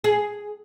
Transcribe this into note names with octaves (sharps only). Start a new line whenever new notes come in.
G#4